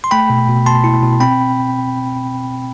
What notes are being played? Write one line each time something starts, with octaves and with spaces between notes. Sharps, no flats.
C6
A3 G5 B5
B2
B2
B2 A5 C6
E4
B2
C4 G5 B5